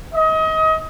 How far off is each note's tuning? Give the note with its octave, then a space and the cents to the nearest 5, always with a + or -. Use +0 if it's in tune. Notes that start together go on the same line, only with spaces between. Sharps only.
D#5 +30